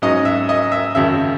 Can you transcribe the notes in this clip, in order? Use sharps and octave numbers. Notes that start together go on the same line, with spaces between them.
G#2 F#3 C#4 D#5
E5
D#5
E5
G#1 F#2 C#3 E5